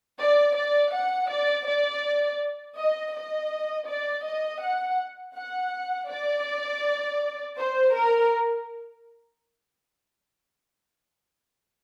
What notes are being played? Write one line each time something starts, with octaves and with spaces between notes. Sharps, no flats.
D5
D5
F#5
D5
D5
D#5
D#5
D5
D#5
F#5
F#5
D5
C5
A#4